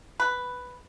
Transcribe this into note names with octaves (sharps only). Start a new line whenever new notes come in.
B4